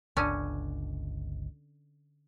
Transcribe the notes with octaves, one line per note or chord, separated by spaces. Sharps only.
G1 C#2 D3 C#4